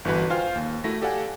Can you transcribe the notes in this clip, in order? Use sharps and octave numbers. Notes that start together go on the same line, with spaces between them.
G1 E3 F#4 B4
F4 C5 F5 G5 G#5 F6
D#2
A3 E4 F#4 A#6
G4 A4 D5 F5 F#5 G#5